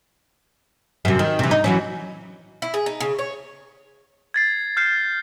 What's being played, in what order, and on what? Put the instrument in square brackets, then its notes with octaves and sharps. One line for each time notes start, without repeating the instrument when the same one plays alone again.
[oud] F#2 C3
D#3
C3 E3
D#4
E3 F#3 C#4
[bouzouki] E4
G#4
D#4
C#3
C#5
[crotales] G#6 A6 C7
F6 G6 C7